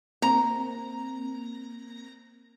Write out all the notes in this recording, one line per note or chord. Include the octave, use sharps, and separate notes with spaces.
A#3 C4 A#5